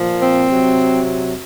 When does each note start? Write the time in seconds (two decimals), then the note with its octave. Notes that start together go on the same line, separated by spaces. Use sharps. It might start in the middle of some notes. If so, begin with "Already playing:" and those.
Already playing: A#2 F3
0.20 C4
0.49 C3 F#3